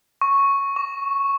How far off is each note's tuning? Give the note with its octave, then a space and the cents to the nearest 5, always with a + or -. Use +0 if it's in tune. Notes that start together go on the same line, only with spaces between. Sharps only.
C#6 -5
C#6 +30